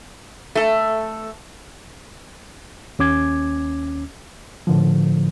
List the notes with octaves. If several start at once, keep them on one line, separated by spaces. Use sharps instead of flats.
A3 A4
D#2 C#4 D6 G#6
A2 D3 F3